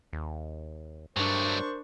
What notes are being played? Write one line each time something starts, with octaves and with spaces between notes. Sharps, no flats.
D#2
G2 F#3 A3 D4 A#4 C5 C#6